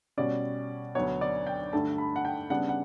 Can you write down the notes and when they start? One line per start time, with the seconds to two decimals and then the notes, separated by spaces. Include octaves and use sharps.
0.17 B2 G3 C#4 D5
0.95 D2 D3 F#3 B3 C#5
1.21 D5
1.47 G5
1.73 G2 D3 A3 A5
1.98 B5
2.16 F#5
2.25 G5
2.50 C#3 G3 B3 D4 F#5
2.69 F#5